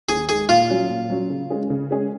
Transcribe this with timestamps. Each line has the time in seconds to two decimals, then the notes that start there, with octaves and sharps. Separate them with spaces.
0.09 D#2 G#4
0.29 D#3 G#3 G#4
0.49 A#2 F4
0.69 F#3 C#4 F#4
0.89 A#2
1.09 F#3 C#4 F#4
1.30 C#3
1.50 G#3 C#4 G#4
1.70 C#3
1.91 G#3 C#4 G#4